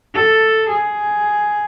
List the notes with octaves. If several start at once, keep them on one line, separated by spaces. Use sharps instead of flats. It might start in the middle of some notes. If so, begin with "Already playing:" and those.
A4
G#4